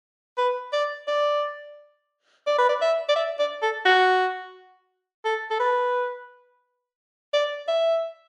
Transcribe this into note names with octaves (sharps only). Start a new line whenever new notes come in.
B4
D5
D5
D5
B4
D5
E5
D5
E5
D5
A4
F#4
A4
A4
B4
D5
E5